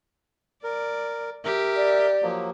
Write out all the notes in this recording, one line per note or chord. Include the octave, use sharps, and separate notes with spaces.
A#4 D5
G4 A#4 E5
D5
F3 F#3 A#3